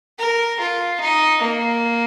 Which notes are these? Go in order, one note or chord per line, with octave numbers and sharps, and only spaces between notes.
A#4
F4
D#4
A#3